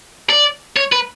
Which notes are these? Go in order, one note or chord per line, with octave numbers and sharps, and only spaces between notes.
D5
C#5
B4